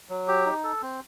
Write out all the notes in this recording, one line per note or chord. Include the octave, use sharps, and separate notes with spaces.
F#3
G4
D#4
A4
C4